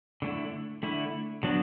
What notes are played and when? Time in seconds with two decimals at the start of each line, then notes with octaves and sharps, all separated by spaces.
0.22 D3 A3 E4
0.83 D3 A3 E4
1.43 D3 F#3 B3 D4